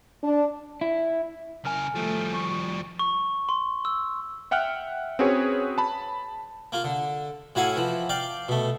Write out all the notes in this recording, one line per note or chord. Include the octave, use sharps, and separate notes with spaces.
D4
E4
C#3 A#4 G#5 F6
F3 G3 A3
C#6
C#6
C6
E6
E5 F#5 G5 F6 F#6
C4 C#4 F#4 G#4 B4 C#5
A5 B5
A#3 F4
D3
A2 F#3 E4 F5 F#5 G#5
E3 F3
D5 F5 G5
B2 A3